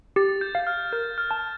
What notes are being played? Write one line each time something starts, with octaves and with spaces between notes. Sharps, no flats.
G4 A6
G6
F5
G6
F6
A#4 G6
F6
A5